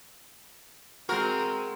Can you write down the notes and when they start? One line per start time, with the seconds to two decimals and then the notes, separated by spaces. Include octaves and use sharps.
1.09 G#3 C4 F#4 A#4